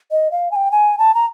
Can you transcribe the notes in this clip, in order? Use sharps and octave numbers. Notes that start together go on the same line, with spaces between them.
D#5
F5
G#5
G5
G#5
A5
A#5